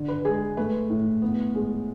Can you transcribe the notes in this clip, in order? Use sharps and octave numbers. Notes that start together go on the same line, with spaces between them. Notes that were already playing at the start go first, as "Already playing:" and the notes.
Already playing: D3
B4
G#3 G#4
A3 B4
A2
B3
G#3